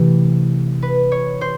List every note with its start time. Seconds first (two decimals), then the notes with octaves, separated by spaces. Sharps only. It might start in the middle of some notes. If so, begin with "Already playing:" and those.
Already playing: C3 E3 A3
0.82 B4
1.12 C#5
1.41 C5